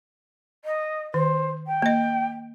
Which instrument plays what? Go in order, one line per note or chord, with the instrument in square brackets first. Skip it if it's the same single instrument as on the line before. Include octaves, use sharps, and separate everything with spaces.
[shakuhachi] D#5
[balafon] D#3 [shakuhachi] C5
[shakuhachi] G5
[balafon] A#3 D#5